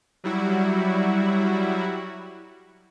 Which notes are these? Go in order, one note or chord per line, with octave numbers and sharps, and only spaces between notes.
F#3 G3 E4 F#4